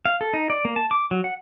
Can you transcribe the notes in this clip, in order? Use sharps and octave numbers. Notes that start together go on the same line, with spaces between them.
F5
A4
D#4
D5
A#3
A5
D6
F#3
F#5